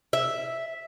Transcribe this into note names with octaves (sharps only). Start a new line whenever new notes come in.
E5